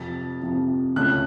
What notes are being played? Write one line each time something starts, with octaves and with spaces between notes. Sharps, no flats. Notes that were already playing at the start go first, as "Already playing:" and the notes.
Already playing: F2 C3 F3 A6
F2 C3 F3
C#2 C#3 A3 C#4 F#6